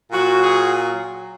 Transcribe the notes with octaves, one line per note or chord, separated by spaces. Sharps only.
A#2 F#3 F#4
G#4